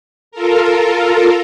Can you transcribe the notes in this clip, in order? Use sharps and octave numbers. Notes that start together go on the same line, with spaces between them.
F4 A4 A#4